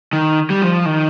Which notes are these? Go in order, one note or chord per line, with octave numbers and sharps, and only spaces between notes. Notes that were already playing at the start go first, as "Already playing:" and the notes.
D#3
G3
F3
D#3